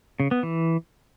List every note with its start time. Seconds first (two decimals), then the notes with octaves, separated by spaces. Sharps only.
0.20 C#3
0.31 B3
0.43 E3